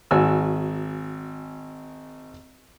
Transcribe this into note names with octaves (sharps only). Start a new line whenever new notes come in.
G#1 F#4 G#5 E6